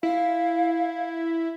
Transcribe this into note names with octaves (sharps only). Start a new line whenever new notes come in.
E4 F5